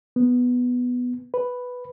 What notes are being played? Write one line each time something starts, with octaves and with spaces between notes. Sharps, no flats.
B3
B4